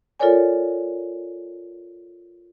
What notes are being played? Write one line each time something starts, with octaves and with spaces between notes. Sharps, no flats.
F4 A4 A#4 C#5 D5 G#5